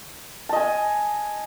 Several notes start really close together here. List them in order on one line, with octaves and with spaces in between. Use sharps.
A5 D#5 G#5